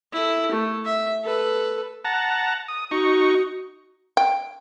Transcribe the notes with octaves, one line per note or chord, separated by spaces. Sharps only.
E4 A4
A3
E5
A4 B4
F#5 A5 A#5
D#6
D#4 F#4 C#6
G5